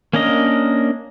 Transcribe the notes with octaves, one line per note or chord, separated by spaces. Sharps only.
A#3 C#4 D4 A#4 D#5